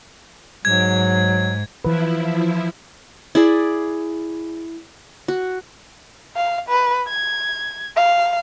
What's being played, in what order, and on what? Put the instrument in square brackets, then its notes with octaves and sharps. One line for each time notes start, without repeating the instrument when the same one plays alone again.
[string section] G#2 [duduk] F#3 [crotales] G#6
[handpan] E3 B4 [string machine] F3 E4
[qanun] E4 G#4 D5
F#4
[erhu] F5
B4
G#6
F5